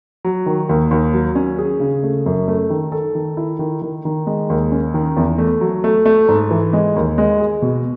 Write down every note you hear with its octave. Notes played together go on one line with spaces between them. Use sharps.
F#3
D#3
D#2
D#2
F#3
C#4
G#4
C#3
A3
F#2
A3
D#3
A4
D#3
E4
D#3
D#3
D#3
G#3
D#2
C#4
D#3
E2
A3
F#3
A3
A3
G#2
E3
G#3
D#2
G#3
G#4
B2